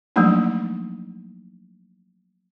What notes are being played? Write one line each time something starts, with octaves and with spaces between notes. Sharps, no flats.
F3 F#3 A3 A#3 D4 D#4